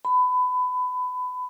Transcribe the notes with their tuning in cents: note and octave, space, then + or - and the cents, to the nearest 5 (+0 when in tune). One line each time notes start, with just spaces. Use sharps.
B5 +25